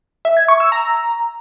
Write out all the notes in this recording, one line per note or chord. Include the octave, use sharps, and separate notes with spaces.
E5
G#6
C#6
E6
A#5